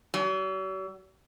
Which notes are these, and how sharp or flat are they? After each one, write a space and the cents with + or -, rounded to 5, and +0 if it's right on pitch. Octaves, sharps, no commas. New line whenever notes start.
F#3 +45